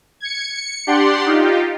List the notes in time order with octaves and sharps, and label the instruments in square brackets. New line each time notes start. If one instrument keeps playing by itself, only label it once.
[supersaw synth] G#6 C#7
C#7
D4 G4 D5 F#5 C6
D#4 F4 G4